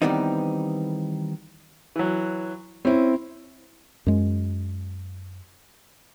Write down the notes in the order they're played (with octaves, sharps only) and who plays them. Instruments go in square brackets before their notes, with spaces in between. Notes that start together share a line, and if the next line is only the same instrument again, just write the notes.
[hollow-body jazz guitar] D#3 E3 G3 B3 C4 D#4
[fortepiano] E3 F#3
[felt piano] C4 E4 [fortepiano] C#4
[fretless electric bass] F#2 G#3